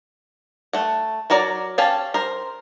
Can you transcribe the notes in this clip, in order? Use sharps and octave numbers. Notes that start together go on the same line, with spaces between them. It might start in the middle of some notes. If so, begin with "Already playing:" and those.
A3 F#5
F#3 F#4 A#4 D5
C#4 G4 F5 G#5 A5
A#4 C5